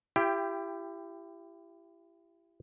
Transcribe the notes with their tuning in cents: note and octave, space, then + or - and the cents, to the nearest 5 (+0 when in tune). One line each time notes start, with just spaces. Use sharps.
E4 +35 G4 +0 G5 +20